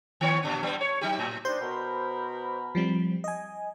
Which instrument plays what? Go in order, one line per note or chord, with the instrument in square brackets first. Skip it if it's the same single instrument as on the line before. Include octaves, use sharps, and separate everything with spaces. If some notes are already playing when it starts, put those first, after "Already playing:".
[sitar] D#3 B3 C#5
A#2 C#3 D4
G2 G3 B3
C#5
F#3 D#4 G4
A2
[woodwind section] G3 D4 D#4 [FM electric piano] C5 C6 G6
[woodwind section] B2 A#4 B5
[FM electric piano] F3 G3 C4
D#5 G#5